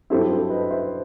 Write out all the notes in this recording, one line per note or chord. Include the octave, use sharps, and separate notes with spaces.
G2 F#3 C4 E4 A4 C5
A4 C5
B4 D#5
C5 E5